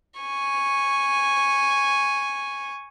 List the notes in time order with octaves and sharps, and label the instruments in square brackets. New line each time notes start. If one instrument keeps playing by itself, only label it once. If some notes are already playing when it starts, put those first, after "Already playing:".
[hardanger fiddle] G#5 C#6